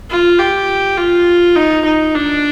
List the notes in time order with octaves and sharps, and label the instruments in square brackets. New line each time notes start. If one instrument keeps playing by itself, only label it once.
[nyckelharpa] F4
G4
F4
D#4
D#4
D4